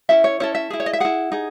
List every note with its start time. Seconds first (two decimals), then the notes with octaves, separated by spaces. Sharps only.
0.09 C#4 E4 A4 E5
0.24 C#5
0.40 C#4 E4 A4 C#5
0.55 E5
0.70 E4 G#4
0.80 C#5
0.86 D#5
0.93 E5
1.00 E4 G#4 F#5
1.32 D#4 G#4